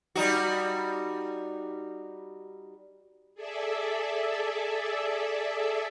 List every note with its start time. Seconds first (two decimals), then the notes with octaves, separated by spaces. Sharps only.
0.15 G3 D#4 F#4
3.35 G#4 A4 D5 E5